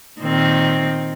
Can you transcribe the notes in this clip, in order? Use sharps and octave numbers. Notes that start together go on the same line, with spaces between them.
A#2 D#3 C4